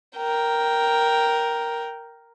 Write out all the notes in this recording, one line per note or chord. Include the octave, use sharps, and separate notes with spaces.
A#4 G5